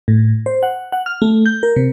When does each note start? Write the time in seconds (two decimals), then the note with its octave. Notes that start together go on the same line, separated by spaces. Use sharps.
0.08 A2
0.46 C5
0.63 F#5
0.92 F#5
1.06 F6
1.22 A3
1.46 G6
1.63 A#4
1.76 C3